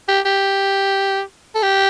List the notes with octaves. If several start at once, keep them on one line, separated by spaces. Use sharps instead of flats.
G4
G4
A4
G4